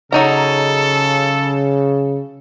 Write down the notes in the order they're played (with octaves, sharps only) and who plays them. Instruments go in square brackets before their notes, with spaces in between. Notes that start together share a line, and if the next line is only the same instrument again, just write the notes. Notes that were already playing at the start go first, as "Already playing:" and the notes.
[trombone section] C#3 [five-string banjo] F#3 D#4 A#5 [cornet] A4